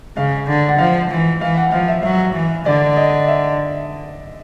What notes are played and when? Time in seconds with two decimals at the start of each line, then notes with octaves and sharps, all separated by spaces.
0.17 C#3 F5
0.47 D3
0.68 F#5
0.79 F3 F5
1.10 E3
1.41 E3 F5
1.57 F#5
1.72 F3 F5
1.88 E5
2.03 F#3 E5
2.34 E3
2.66 D3 D5
2.97 D#5
3.28 E5